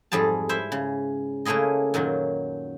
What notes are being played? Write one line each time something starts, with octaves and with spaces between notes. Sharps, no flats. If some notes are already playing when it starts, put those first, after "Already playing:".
F2 G#2 G3 G#4 A5
E4 C5 E5
C#3
C#3 A3 A#3 E4 G#4 D#5
F#2 A#2 D#3 F#3